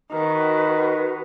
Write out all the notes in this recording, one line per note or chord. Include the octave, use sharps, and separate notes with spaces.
D#3 F#4 B4